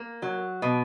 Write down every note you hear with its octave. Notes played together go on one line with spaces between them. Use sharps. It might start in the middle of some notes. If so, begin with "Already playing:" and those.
Already playing: A#3
F#3
B2